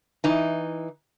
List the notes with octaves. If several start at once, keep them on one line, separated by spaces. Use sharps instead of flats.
E3 D#4